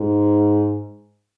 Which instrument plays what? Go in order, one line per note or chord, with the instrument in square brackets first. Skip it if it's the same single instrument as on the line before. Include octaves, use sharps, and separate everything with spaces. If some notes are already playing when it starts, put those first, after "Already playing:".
Already playing: [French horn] G#2